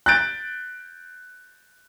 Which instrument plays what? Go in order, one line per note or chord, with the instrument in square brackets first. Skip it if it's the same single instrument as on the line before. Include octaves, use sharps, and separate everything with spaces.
[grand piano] F#6 G6 A6 D7